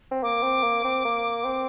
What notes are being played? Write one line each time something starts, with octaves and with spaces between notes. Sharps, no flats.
C4
A#3 D6
C4
A#3
C4
A#3
C4